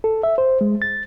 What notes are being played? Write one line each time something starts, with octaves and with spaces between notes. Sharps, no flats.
A4
E5
C5
G#3
A6